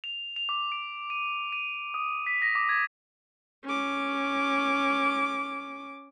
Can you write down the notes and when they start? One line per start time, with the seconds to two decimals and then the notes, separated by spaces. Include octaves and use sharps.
0.04 F7
0.36 F7
0.49 D6
0.72 D7
1.10 D#7
1.52 D#7
1.94 D#6
2.27 B6
2.42 A#6
2.55 D6
2.69 G#6
3.65 C#4 D6